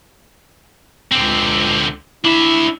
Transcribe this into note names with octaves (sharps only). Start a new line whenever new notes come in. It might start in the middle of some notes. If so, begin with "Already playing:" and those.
C#2 D3 C4
D4 E4 E5